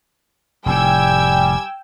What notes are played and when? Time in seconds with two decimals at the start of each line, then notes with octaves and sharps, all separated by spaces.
0.66 F1 A2 G3 G5 G#5 E6 G#6